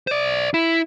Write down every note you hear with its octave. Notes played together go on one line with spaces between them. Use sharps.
C5 D5
E4